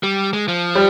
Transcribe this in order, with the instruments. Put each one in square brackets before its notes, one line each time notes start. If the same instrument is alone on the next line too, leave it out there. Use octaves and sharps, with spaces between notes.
[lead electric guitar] G3
G#3
F3
[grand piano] G3